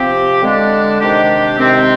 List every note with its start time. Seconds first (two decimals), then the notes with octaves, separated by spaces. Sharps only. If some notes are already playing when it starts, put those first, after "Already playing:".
Already playing: C3 F3 C4 G4
0.41 D3 G#3 D4
1.00 C3 D#3 G#3 D4 G4
1.57 C3 D#3 G#3 C4